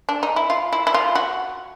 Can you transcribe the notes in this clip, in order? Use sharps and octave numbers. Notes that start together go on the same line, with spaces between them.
D4
D#4
E4
F4
E4
E4
F4
F#4